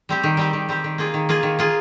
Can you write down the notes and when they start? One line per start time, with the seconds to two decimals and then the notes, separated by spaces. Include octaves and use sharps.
0.09 G3 C4 G4
0.23 D#3
0.37 G3 C4 G4
0.53 D#3
0.69 G3 C4 G4
0.84 D#3
0.98 A#3 F4 G#4
1.14 D#3
1.29 A#3 F4 G#4
1.43 D#3
1.59 A#3 F4 G#4